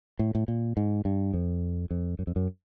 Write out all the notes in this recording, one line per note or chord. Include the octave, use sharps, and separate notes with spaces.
A2
A2
A#2
G#2
G2
F2
F2
F#2
F2
F#2